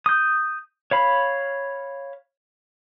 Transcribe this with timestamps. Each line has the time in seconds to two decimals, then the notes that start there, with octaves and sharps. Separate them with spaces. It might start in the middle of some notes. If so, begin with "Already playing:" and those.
0.06 D#6 G6
0.91 C#5 F5 B5